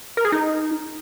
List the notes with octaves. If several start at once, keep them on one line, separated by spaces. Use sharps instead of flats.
A#4
G#4
D#4